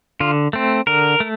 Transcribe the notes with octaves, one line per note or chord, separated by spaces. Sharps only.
D3 F4
A3 C4
D3 A#4
A3